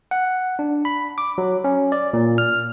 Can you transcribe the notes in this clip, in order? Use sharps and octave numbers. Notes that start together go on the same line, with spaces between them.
F#5
D4
B5
D6
F#3
C#4
D5
A#2
F6